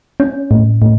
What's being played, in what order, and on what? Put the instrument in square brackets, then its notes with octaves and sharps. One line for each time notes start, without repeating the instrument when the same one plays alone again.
[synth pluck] C#4
A2
A2